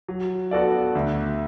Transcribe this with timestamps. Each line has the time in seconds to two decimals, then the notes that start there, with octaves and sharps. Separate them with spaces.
0.08 F#3
0.51 B3 F#4 A4 D5
0.95 D2